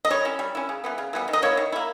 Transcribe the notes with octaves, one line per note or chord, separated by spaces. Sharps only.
D#5
G3 C#5
C#4 E4
G3
C#4 E4
C#3
E3 G3 B3
C#3
E3 G3 B3
D#3
D#5
A#3 E4 C#5
D#3
A#3 E4